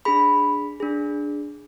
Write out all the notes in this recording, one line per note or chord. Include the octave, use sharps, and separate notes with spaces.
D4 G#4 B5
D4 G#4